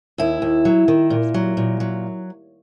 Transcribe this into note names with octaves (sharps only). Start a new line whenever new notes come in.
D#2 E4
D#2
F#3
D#3
A#2
F#3
A#2
F#3